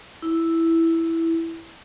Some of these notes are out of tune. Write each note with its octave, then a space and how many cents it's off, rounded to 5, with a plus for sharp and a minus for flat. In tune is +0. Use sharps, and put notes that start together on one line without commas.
E4 +0